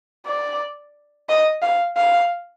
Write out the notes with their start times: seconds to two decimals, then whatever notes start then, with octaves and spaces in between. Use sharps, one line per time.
0.26 D5
1.29 D#5
1.62 F5
1.97 F5